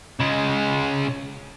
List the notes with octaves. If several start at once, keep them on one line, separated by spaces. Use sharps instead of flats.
C#3 G#3